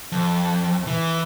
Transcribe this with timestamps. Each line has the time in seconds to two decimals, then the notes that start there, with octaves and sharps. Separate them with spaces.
0.12 F2
0.87 E3